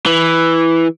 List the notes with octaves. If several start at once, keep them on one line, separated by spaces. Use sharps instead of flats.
E3